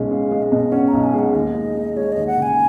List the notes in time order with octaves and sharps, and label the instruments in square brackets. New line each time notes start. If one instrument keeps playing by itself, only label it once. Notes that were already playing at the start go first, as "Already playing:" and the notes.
Already playing: [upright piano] B1 B2 G#3 C#4
[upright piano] G#3 [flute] F5
[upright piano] G#3
[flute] D#5
[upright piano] B2
[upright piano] C#4 [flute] F#5
[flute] A#5
[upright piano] B1
[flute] G#5
[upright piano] G#3
[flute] F#5
[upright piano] D#2 [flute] D#5
[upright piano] G#3
G#3
[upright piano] G#3 [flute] C#5
[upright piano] D#2 [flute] D#5
[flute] F#5
[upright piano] C#3 [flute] G#5